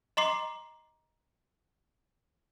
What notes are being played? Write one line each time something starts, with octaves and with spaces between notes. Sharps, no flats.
D#5 A#5 C6 D6 C7